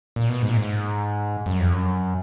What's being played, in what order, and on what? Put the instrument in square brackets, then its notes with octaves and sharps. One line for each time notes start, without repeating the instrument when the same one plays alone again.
[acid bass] A#2
B2
G#2
A#2
G#2
F#2
F2
F#2